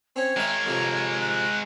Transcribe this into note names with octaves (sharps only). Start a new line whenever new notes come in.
C4 C#4 C#5
G#3 A#4 E5 G5
F2 C3 F3
F#6